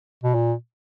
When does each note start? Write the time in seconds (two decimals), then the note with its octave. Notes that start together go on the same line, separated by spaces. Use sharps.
0.23 B2
0.34 A#2